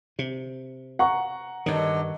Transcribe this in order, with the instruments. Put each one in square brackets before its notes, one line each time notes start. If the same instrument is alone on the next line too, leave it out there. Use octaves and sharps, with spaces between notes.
[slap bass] C3
[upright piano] F#5 A#5 C#6
[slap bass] G2 D#3 [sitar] D3 F#3 D#5